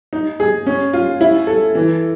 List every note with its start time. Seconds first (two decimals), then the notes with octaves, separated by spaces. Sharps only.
0.13 D#4
0.40 G#4
0.66 C#4
0.93 F4
1.21 E4
1.47 A4
1.75 E3